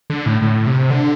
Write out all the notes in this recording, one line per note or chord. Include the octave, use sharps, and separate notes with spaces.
D3
A2
A2
C3
D3